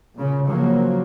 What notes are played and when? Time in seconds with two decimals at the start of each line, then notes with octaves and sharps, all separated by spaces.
0.16 A#2 C#3
0.49 C#3 F3 F#3 A#3